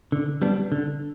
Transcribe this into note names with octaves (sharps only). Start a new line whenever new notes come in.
D3
G3 B3 D4
D3